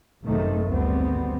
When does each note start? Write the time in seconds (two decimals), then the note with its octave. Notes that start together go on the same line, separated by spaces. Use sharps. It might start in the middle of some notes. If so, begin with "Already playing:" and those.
0.24 G#1 F#2 C3 D#3 A3
0.66 G#1 D2 G3 B3 C4